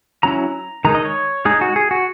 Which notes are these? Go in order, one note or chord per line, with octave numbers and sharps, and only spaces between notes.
F#3 C#4 E4 A#5
D#3 G#3 D#4 A#5
D#5
C#5
G#3 D#4 G#4
F#4
G#4
F#4